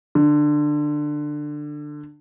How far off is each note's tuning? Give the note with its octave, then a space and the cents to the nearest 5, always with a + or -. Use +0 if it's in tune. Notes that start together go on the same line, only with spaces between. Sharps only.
D3 +15